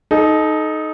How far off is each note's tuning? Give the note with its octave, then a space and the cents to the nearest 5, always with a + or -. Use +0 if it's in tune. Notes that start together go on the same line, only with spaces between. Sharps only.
D#4 +0 A4 -30